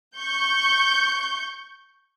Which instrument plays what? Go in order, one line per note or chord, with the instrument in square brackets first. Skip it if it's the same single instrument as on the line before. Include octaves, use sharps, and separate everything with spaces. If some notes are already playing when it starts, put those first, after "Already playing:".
[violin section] C#6 G6